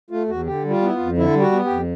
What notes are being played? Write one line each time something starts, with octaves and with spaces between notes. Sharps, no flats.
A3 F4
E2 F#4
D3 G4
G3
F4
B3 E4
F4
F2
D3 E4
G3
F#4
B3
G4
F2